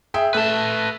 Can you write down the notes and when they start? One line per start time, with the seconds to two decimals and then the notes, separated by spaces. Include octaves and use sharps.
0.14 G#4 E5 G5
0.34 A3 B4 A5